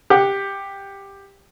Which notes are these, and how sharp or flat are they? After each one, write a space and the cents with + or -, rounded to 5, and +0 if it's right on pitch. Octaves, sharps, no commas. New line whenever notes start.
G4 +10 F#5 +0